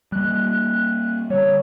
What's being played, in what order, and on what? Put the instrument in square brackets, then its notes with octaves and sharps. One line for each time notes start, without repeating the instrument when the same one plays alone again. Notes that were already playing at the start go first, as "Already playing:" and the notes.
[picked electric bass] G3 A#3 [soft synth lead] F#6
[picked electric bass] D3 G3 [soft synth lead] C#5